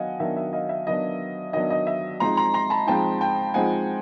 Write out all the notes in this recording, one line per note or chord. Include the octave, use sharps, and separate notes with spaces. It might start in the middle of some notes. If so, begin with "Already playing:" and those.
Already playing: D#3 F#3 B3 D4 D#5 F5 F#5 G#5
D#3 F#3 B3 D4 E5
E5
D#5 F5
E5
D#3 F#3 B3 D4 D#5
D#3 F#3 B3 D4 D#5
D#5
E5
F3 G#3 C4 D#4 A#5 C6
A#5 C6
A#5 C6
A5 B5
F3 G#3 C4 D#4 G5 A5
G5 A5
F3 G#3 C4 D#4 F#5 G#5